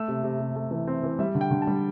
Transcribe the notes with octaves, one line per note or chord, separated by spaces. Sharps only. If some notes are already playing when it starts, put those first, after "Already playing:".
Already playing: A3 E6
C3
C3
C3
A3
E3
C4
E3
G3 E5
D3
G5
D3
A5
G3